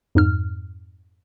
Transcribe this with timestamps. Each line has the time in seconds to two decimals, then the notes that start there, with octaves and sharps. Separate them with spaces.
0.15 F2 G#2 F6